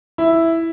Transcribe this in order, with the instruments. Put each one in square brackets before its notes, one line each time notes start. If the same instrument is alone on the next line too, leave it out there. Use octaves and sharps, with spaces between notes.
[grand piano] E4